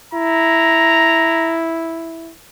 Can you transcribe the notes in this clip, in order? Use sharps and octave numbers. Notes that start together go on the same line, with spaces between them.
E4 A#5